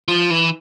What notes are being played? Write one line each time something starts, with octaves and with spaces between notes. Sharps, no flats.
F3
E3